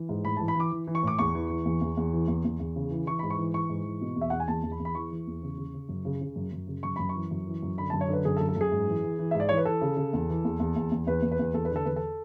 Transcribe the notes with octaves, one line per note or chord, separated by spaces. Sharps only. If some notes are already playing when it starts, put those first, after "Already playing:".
Already playing: E3
G#2
A2 B5
E3 A5
B5
E3 D6
E3
E3
C#6
A2 D6
E2 C#6
E3
E3
E2
E2
E2
E3
E2
E2
E2
C#3
E3
E3 C#6
G#2 B5
C#6
E3
E3 C#6
G#2
E3
B2
E2
E5
E2 F#5
G#5
E2 A5
E2
B5
E2
B5
E3 C#6
E3
E2
C#3
C#3
C#3
F#2
C#3
C#3
F#2
F#2
C#3
F#2 C#6
F#2 B5
C#6
E3
F#2
E3
F#2
D3 B5
F#2 A5
C#5
D3 B4
F#2 G#4
A4
F#2
A4
F#2 G#4
G#2
E3
E3
E3
G#2 E5
D5
E3 C#5
B4
E3 A4
C#3
C#3
E2
E3
E2
E2
E2
E2
E2 B4
E2
B4
E2
E2 A4
B4
D3 A4
E2 B4
A4